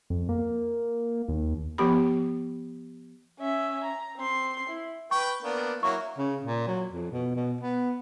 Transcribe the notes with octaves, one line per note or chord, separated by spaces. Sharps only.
F2
A#3
D#2
F3 B3 G4 B5
C#4 E5
A#5
C4 C6
E4
B4 G5 C#6
A#3 B3 D4
F#3 A#3 E4 C#6
C#3
A#2
F#3
F2
B2
B2
B3